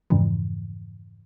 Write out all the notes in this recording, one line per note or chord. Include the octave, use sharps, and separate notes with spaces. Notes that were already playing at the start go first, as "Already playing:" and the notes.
F2 G#2 C#3 E3 F3